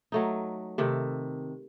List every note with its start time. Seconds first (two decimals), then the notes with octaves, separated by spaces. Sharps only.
0.12 F#3 A3 D#4
0.78 C3 D#3 A3